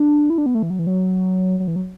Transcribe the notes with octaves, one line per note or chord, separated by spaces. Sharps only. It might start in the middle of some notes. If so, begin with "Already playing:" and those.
Already playing: D4
E4
D4
B3
A3
E3
F#3
E3
F#3
F#3
E3
F#3